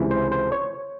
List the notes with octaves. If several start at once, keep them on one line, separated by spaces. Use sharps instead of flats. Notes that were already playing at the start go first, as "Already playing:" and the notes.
Already playing: C#2 C3 E3
C5
C5
C#5